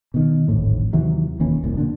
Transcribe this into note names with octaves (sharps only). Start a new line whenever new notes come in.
B2 D#3
D1 G#1 F2 A2
D#2 C3 E3 F#3
E1 D#2 E3 C#4
F1 C2 A#2
A#2 D3 D4